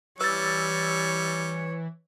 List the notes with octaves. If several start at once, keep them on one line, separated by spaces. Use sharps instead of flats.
E3 G3 C#5 E6 A6